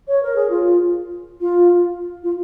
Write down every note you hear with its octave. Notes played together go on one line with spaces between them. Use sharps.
C#5
A#4
G#4
F4
F4
F4